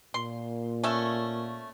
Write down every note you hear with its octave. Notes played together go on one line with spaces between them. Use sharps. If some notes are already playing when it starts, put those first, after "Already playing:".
A#2 C6
A3 C#4 E5